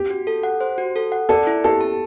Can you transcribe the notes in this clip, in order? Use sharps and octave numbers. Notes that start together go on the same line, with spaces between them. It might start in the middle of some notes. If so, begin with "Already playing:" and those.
Already playing: G4
F#4
A4
F#5
C5
F#4
A4
F#5
A4 D5
E4
G4 A4
A5